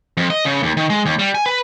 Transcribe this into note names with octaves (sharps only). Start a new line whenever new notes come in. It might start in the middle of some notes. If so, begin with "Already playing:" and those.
F2
D#5
C#3
D#2
D#3
G#3
D#2
G3
G#5
B4